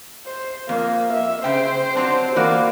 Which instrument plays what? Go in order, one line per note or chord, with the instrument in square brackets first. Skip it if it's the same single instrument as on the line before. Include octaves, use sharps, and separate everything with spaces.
[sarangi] C5
[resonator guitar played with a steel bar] F2 [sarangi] A#3
[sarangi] E5
[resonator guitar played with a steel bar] C#3 G5 [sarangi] C5
[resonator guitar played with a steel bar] F#3 C4 D4
[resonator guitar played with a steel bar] E3 F#4 D5 [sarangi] A#3